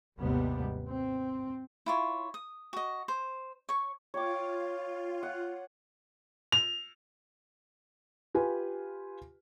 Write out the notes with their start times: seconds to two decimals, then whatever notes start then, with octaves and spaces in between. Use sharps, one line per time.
0.20 G#1 D#2 C3 G3 B3
0.88 C4
1.86 E4 F4 C#5
2.34 D#6
2.73 F#4 D#5
3.08 C5
3.69 C#5 C#6
4.14 F4 C#5 G5 D6
5.23 F#5
6.52 F7
8.35 F4 G4 B4 G#5